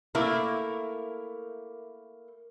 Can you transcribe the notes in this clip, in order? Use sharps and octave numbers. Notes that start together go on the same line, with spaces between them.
A3 A#3 E4 A#4